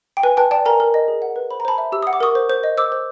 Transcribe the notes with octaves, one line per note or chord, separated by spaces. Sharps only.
G5
B4 G#5
B4 G5 A5
D5 G5 A5
A#4 G#5 A#5
A#4
D#5
G#4
F#5
B4
C5 B5
A#5
C5 A5 B5
E5
G4 E6
F#5 D#6
D6
A#4 C#6 D#6
C5
C5
D#5
C5 D6 E6
C5